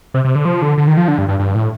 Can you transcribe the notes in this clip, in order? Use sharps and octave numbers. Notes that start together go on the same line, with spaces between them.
C3
C3
D3
F3
D3
D3
D#3
F3
D3
G2
G2
G2
A2